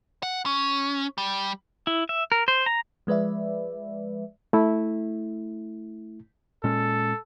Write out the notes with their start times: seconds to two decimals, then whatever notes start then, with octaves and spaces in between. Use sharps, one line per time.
0.23 F#5
0.46 C#4
1.18 G3
1.87 E4
2.09 E5
2.32 A#4
2.48 C5
2.66 A#5
3.07 F3 G#3 B4 D5 E5
4.53 A3 E4
6.64 A#2 G#3 C#4 A4